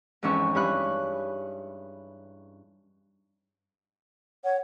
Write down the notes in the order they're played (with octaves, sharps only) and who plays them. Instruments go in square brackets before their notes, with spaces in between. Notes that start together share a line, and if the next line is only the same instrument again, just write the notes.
[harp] F2 G#2 E3 C#4 C#6 E6
G2 E4 C#5 B5 D#6 F#6
[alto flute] C#5 [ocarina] F#5